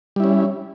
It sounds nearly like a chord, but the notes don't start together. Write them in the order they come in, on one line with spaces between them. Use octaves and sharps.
G3 E4 C#4